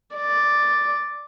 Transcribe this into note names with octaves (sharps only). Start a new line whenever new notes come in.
D5